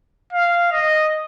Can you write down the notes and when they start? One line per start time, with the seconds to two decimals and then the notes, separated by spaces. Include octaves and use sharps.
0.33 F5
0.72 D#5